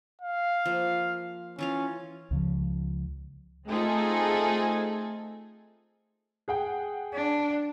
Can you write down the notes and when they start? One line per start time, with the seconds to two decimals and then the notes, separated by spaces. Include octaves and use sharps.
0.22 F5
0.65 F3 A#3
1.59 E3 C#4 F4 F5
2.31 C#2 C#3 F3
3.67 A3 C4 D#4 F4 G#4 A4
6.48 G#4 F#5 G5
7.14 D4